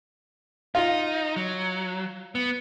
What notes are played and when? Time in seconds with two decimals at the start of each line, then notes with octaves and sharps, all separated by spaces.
0.75 D#4 F4
1.36 F#3
2.35 B3